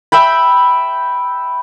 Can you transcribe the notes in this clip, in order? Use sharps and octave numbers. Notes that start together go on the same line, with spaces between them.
E5 G5 B5